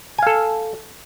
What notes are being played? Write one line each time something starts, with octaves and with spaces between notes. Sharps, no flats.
A4 F5 G#5